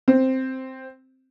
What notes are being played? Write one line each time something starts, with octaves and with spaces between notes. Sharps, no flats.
C4